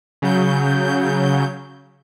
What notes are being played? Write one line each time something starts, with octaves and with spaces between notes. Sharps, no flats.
C#3 F#3 G6